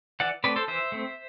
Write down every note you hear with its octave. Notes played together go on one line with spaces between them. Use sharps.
E3 D5 F#5
A3 C4 B4 D5
A4 C5
E3 C5 E5
A3 C4